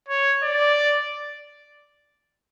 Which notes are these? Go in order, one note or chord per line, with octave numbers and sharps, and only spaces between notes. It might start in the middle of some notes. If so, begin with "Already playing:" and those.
C#5
D5